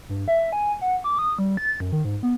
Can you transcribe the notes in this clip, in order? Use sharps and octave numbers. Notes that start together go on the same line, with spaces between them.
G2
E5
G#5
F#5
D6
D#6
G3
A6
F#2
D#3
G#2
B3